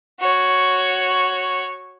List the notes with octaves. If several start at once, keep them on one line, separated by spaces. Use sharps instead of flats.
F#4 C#5